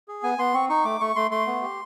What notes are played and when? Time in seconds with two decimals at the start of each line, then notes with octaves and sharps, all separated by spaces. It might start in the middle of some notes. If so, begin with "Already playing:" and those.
0.08 G#4
0.23 B3 G#5
0.38 B3 C6
0.54 C4 C#6
0.69 D#4 C#6
0.85 A3 D6
1.01 A3 C#6
1.16 A3 C6
1.31 A3 C6
1.47 B3
1.62 G4